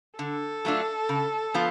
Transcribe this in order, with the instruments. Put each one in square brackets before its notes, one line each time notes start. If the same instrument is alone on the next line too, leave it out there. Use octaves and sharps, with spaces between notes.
[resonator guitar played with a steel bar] D3 [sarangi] A4
[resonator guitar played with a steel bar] F#3 A3 D4 F4
C#3
F3 B3 F4